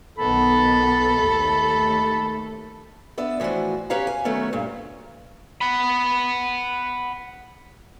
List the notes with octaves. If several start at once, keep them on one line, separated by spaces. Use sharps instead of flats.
B1 D#3 B3 A4 B5
D#2 A3
B3 D4 E5
A2 E3 F3 D4 F#4
C#4 G4 B4 C#5 F5 A#5
G#5
D#3 F#3 A3 B3 C#4
G2 A#2
F#5 B5